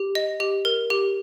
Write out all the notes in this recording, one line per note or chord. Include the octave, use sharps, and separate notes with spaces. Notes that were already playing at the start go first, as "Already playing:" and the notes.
Already playing: G4
D#5
G4
A#4
G4